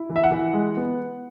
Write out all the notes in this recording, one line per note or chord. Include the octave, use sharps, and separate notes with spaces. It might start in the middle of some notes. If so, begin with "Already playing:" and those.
Already playing: E4
E3
E5
F#5
E3
G#3
B3